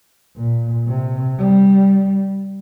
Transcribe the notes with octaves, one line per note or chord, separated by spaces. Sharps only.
A#2
C3
G3